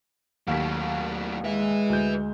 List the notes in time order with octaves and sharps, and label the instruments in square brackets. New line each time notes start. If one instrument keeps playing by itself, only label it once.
[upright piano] D#2 B6 [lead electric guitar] F#3 A3
[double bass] G#3 [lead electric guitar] B4 E5
[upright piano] D2 G6